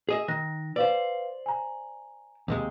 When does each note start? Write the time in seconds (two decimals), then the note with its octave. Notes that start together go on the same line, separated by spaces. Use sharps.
0.09 G#4 D#5 E5
0.28 D#3 F#6 A#6
0.76 B4 C5 D5 F5
1.46 G#5 A#5
2.48 D#2 C3 G#3